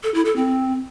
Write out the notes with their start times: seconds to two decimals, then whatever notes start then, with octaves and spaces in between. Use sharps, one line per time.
0.03 A4
0.14 E4
0.25 A4
0.36 C4